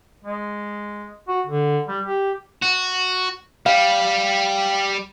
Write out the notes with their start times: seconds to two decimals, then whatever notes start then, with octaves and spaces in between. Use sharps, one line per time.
0.24 G#3
1.28 F#4
1.46 D3
1.88 G3
2.05 G4
2.62 F#4
3.66 G3 F5